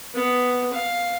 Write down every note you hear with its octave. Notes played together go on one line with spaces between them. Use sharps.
B3
F5